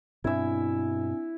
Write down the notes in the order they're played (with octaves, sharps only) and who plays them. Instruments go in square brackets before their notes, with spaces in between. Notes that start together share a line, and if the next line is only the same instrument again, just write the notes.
[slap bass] G2 B2 [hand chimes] C4 D4 G#5 [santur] E4 E5